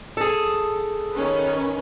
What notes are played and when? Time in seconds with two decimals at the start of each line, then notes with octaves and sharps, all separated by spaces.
0.17 G#4 A4
1.13 D#3 C#4 B4